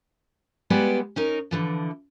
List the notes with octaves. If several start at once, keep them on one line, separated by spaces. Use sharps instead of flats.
G3 G#3 B3 G4 B4 D5
C#4 D#4 A#4
D3 E3 F3